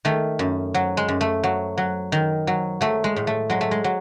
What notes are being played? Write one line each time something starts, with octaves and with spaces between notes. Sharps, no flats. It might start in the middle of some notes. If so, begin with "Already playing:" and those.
D#3 A3
F#2
F#3
G#3
F#2
A3
F#3
F#3
D#3
F#3
F#3 A3
G#3
A2
A3
F#3 G#3
A3
G#3
F#3